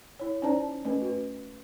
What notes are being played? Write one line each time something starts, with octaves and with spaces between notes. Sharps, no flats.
E4 C#5
C#4 D#4 C5 D5 A5 A#5
A3 C#4 B4
F#4 B4